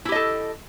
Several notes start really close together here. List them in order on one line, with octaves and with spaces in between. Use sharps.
E4 G4 D#5 A4